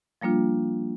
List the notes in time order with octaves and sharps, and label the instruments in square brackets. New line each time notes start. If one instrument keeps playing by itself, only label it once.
[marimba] F3 G3 A#3 D4 F4